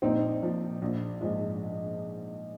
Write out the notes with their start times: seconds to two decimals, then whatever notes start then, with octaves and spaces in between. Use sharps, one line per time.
0.02 A#1 C4 D#4
0.42 A#2 F3
0.82 A#1
1.21 G#2 F3 G#3